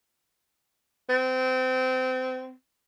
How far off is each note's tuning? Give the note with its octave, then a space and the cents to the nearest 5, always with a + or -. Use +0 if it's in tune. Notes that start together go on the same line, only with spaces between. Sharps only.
C4 -25